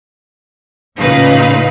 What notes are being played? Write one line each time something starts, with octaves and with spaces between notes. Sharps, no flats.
A1 A#2 C#3 D#4 B4 F5